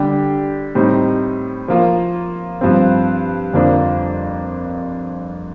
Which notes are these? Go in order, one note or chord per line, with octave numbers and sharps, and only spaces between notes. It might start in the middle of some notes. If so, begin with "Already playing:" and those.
Already playing: D3 G3 D4 G4
A2 G3 C4 D#4
F3 A#3 F4
G2 F3 C4
F2 D3 F3 A#3 D4